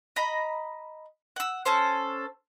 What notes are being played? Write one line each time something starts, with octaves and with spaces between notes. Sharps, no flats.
D#5 A#5 B5
F#5 E6
C#4 A4 C5